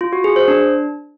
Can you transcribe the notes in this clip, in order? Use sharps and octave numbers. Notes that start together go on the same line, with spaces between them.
F4
F#4
G#4
C5
D4